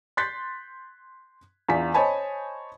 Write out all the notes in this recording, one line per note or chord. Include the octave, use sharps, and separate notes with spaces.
C6 F#6 G6 A6 B6 C7
E2 D4 F4 B6
C5 C#5 D#5 G#5 A5 B5